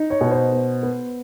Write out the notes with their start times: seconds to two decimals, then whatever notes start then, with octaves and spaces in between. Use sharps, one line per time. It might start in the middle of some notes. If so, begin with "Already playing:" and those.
Already playing: D#4
0.10 C#5
0.21 B2
0.31 C5
0.51 B3
0.83 B3